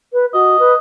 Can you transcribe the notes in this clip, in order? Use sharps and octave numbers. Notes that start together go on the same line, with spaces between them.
B4
F#4 D#5
B4